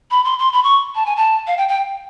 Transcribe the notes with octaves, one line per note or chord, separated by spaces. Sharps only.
B5
C6
C6
B5
C#6
A5
G#5
A5
F5
G5
G5